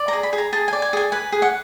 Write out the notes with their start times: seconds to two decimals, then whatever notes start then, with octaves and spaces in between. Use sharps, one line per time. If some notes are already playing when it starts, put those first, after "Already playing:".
Already playing: D5
0.08 A#5
0.13 G#4
0.23 B5
0.33 G#4
0.38 A#5
0.53 G#4 A5
0.68 G#5
0.73 D5
0.82 G#5
0.93 G#4 G#5
1.12 B4 G#5
1.32 G#4
1.42 F#5